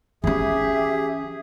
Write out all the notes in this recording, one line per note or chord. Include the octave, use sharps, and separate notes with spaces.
E3 C#4 G4 G#4 E5